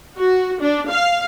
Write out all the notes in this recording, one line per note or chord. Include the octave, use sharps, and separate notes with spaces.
F#4
D4
F5